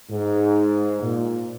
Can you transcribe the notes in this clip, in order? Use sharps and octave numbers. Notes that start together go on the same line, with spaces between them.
G#2
A#2